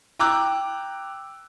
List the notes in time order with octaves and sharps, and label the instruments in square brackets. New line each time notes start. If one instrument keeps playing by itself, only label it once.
[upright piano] G5 A#5 D6 E6 F#6